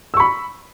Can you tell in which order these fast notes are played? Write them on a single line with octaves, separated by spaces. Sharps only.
E6 C#6 B5